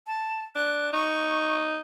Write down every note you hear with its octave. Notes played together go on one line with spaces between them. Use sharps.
A5
D4 F#6
D#4 C#6